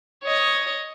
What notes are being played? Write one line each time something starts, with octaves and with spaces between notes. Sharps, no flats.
C#5 D#5